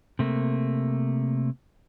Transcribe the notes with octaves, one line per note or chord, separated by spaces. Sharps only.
C3 A3 A#3